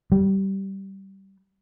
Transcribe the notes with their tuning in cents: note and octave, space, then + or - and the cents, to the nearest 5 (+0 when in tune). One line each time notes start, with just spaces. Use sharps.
G3 -15